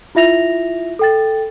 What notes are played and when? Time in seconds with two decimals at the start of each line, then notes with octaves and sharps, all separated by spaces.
0.15 E4 F4 E5 A#6 F7
0.99 A4 G5 A6